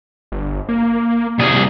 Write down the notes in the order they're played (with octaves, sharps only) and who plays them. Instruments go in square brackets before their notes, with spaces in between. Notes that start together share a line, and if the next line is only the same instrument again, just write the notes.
[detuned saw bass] G1
A#3
[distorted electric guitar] C2 G#4 [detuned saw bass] G3